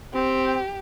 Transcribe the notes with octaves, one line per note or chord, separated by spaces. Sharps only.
C4 G4